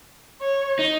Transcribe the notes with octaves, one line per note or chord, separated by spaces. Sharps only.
C#5
D#4